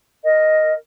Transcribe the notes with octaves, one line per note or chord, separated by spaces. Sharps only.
A#4 D#5